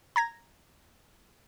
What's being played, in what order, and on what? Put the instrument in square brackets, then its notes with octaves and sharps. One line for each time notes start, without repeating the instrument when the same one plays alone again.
[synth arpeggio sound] A#5 G#6 A#6